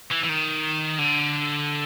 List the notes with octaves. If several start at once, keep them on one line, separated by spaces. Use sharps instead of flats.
E3
E3
D#3
D3